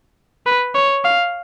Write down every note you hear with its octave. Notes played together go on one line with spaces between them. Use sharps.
B4
C#5
F5